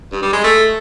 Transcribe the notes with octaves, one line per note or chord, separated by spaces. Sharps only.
G2
G3
G#3
A3